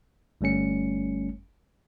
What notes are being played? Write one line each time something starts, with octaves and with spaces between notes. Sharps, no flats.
G1 G3 A3 C#4 C#7